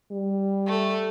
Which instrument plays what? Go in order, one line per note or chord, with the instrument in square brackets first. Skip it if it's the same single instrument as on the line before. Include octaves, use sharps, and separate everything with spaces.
[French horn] G3
[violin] A3